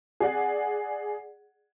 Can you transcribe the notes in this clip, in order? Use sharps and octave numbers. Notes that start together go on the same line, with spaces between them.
G#4 D5 F#5